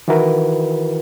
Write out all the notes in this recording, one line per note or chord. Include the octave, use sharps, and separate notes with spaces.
D#3 E3 E4 F#4 A#4 B4